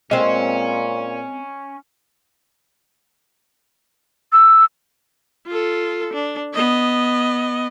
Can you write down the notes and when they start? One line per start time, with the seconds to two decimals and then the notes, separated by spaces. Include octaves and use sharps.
0.11 A#2 G#3 C4 C#4 D#5
4.32 E6
5.47 F4 A4
6.13 D4
6.54 B3 D#5